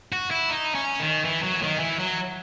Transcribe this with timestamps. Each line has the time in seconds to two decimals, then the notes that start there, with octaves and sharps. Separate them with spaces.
0.12 F#4
0.31 E4
0.50 D#4
0.75 C#4
1.00 D#3
1.25 E3
1.43 F#3
1.62 D#3
1.80 E3
1.99 F#3